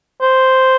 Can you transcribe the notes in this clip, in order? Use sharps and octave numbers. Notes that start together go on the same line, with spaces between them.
C5